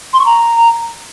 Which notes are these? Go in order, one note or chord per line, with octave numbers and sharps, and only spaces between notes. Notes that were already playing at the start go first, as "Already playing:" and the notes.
C6
C#6
A#5